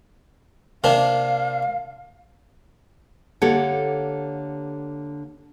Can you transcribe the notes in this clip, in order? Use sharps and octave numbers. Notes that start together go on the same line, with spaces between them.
C3 A#3 D4 F5
D3 A#3 G4 A4 C#5 F#5